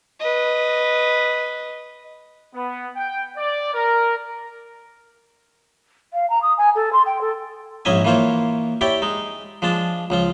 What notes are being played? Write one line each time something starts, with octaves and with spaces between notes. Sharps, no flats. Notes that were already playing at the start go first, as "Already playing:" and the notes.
B4 D#5
B3
G5
D5
A#4
F5
A#5
D#6
G#5
A4
C6
G5
A4
A#1 G#2 C#4 D#5 E5 G#5
E3 A#3 F4 C5 C#5
E4 G4 C#5 D5 G5
G#3 D#4
F3 G#3 D4 A5
C#2 F3 F4